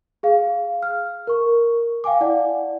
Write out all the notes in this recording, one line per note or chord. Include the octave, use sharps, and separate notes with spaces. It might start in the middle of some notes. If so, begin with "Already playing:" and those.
G#4 F5
F6
A#4 C#6
F5 G5 G#5 D6
E4 D5 F#5